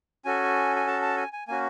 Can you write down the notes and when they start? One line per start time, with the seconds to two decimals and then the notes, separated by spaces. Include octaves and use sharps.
0.25 C#4 F#4 A4 G#5
0.76 G#5
0.87 A5
1.02 A5
1.17 G#5
1.33 G#5
1.48 A#3 C#4 F#4 G#5